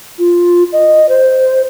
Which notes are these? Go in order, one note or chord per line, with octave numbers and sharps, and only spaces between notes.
F4
D#5
C5